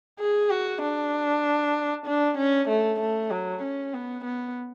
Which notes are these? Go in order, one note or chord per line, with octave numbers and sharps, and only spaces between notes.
G#4
F#4
D4
D4
C#4
A3
A3
F#3
C#4
B3
B3